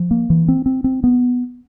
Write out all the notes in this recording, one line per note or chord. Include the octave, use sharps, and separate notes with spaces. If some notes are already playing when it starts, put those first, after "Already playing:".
Already playing: F3
A#3
E3
C4
C4
C4
B3